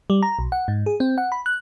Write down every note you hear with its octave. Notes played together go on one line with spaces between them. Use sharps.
G3
A#5
B1
F#5
G#2
G#4
C4
F#5
B5
F#6